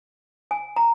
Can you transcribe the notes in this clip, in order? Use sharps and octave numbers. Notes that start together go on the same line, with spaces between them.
G#5
A#5